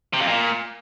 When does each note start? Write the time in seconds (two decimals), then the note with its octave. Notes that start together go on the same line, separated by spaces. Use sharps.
0.13 C3
0.20 F2
0.27 A#2